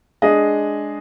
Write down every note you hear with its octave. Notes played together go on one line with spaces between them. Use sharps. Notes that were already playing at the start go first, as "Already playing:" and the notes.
G#3 D4 G#4 D#5